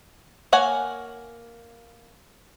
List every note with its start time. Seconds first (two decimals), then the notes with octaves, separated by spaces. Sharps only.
0.52 A#3 C#5 F#5 G#5